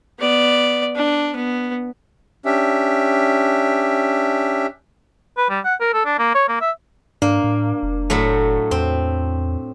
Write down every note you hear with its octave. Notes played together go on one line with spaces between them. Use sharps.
B3 D5
D4
B3
C#4 D4 G4 E5
B4
G3
F#5
A#4
A4
D4
A#3
C#5
A#3
E5
G#2 A#3 D4
A2
F1
A2 F#3 A3
E2 C4